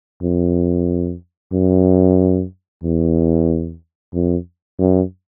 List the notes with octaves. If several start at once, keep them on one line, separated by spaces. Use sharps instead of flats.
F2
F#2
E2
F2
F#2